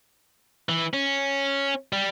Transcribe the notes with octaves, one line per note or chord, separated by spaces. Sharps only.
E3
C#4
G3